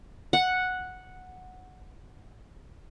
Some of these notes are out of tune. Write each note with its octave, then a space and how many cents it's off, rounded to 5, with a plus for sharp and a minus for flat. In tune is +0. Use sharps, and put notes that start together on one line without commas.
F#5 -5